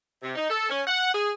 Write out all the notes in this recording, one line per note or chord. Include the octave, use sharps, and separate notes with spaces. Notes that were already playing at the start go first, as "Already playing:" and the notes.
C3
D#4
A4
C#4
F#5
G#4